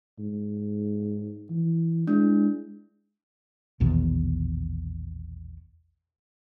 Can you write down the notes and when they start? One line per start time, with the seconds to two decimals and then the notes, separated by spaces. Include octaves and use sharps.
0.19 G#2
1.50 E3
2.07 G#3 D4 E4
3.80 A#1 E2 B2 D#3